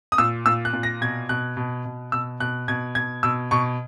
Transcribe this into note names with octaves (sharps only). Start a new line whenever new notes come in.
D#6
A#2 E6
A#2 E6
F#6
A#2
A#6
B2 G#6
B2 F#6
B2
B2
B2 E6
B2 F#6
B2 G#6
B2 G#6
B2 E6
B2 C#6